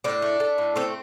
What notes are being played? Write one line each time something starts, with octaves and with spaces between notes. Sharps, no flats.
A2 D4
A3
A3
A2
A3 C4